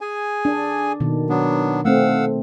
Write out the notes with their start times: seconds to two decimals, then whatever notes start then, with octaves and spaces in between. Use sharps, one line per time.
0.01 G#4 G#5
0.45 D4
1.00 B2 D#3
1.29 F#3 B3 D4
1.85 A3 C4 F5 F#5 E6